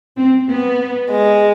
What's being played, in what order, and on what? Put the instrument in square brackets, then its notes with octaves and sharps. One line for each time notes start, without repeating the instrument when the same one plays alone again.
[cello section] C4
B3
[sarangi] G#3